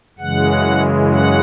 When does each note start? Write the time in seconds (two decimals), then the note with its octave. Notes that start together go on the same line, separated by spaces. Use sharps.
0.18 F#2 C#3 E3 G#3 F#5
1.10 F#5